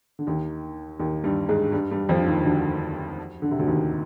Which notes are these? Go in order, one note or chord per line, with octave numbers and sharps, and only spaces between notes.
D3
D#2 D#3
D#2 D#3
G2 G3
G#2 G#3
G2 G3
G2 G3
F2 F3
D#2 D#3
D2 D3
D3
C3
D2 D3
D#2 D#3